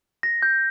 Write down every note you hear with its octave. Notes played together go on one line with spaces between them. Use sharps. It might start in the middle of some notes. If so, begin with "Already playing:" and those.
A#6
G6